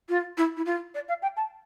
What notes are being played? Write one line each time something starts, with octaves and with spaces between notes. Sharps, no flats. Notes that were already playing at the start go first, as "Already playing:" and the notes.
F4
E4
E4
F4
D5
F5
G5
A5